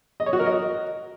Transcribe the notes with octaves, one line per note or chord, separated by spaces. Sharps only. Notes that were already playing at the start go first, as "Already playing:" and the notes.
D#5
C#5
F#4
A#4
D#5